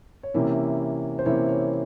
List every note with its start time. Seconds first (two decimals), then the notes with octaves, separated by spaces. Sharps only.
0.23 C#5
0.34 C3 E3 A#3 C#4 E4 E5
1.19 C5
1.26 C3 E3 A#3 C#4 E4 C#5
1.49 C#5